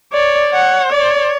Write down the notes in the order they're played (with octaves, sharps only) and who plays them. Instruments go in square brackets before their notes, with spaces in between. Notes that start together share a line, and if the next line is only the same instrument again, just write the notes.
[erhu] C#5 [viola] D5
[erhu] C#5 [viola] F#5
[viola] D5